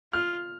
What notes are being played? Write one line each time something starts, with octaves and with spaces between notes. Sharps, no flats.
F4 F6